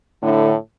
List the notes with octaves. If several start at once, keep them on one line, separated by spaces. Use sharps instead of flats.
A2 D3